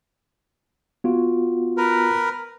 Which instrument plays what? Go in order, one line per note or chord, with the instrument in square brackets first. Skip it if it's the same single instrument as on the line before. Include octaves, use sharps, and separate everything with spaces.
[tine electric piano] B3 F4 F#4
[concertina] A#4 B4